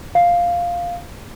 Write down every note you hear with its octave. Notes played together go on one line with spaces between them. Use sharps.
F5